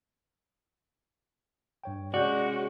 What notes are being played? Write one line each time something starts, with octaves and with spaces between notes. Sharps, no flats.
G2 C#5 G5
C3 G#3 C#4 F#4 D5 G6